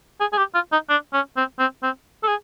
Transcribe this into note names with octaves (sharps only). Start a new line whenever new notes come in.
G#4
G#4
G4
F4
D#4
D4
C#4
C4
C4
C4
A4
G#4